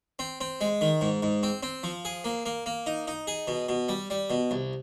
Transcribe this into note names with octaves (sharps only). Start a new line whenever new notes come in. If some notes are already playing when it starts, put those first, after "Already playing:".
C4
C4
G#3
D#3
G#2
G#2
C4
C4
F3
G#4
A#3
A#3
A#3
D#4
D#4
G#4
B2
B2
G3
G3
B2
C2